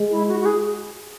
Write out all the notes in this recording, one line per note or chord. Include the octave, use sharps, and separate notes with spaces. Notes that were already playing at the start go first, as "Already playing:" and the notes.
Already playing: G#3
E4
F#4
F#4
G#4